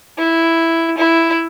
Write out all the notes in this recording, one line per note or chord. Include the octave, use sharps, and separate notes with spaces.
E4
E4